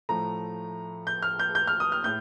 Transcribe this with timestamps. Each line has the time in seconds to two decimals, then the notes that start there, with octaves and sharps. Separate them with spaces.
0.09 A2 F3 A3 A#5
1.07 G6
1.22 F6
1.39 G6
1.55 G6
1.67 F6
1.80 D#6
1.92 F6
2.04 A2 G6